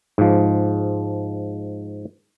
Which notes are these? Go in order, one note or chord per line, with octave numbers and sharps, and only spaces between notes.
G#2 F3